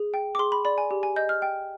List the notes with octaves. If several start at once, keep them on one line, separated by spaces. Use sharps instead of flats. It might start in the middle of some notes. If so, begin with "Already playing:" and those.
Already playing: G#4
G5
D6
G#4 C6
B5
D5 B5
G#5
G4
G#5
D#5 G6
F6
G5